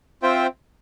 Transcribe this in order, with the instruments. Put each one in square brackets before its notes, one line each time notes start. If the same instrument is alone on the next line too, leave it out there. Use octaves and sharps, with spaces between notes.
[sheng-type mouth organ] C4 F4 C5 E5 G5